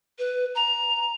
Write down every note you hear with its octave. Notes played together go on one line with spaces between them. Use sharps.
B4
A#5